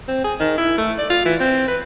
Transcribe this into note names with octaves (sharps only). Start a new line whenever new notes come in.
C4
G#4
D#3
E4
A3
D5
F4
E3
C4
B4